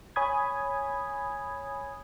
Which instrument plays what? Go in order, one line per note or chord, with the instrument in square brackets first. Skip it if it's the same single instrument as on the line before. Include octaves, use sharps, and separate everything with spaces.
[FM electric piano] C#5 G#5 B5 D#6 G#6